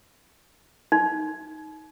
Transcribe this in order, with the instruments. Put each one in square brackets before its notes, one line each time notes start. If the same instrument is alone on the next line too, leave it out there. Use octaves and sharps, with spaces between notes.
[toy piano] D#4